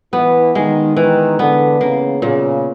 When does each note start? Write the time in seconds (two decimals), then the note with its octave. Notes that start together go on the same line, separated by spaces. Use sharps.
0.13 E3 B3
0.55 D#3 G#3
0.97 D#3 E3
1.39 D3 B3
1.81 C#3 A#3
2.22 A#2 C#3